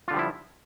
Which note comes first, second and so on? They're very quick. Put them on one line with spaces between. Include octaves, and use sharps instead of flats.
F4 D3 G3 F3 E4